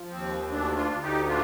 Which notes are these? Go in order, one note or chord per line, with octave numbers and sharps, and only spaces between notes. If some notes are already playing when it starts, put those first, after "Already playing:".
Already playing: F3
D#2 C4
D2 D4
D4 F4
D2
D#4 G4
A2 D4 F4